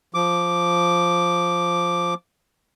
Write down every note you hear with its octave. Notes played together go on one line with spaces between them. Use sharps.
F3 D6